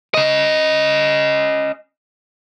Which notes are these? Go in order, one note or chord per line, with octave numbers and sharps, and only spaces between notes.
C#4 D#5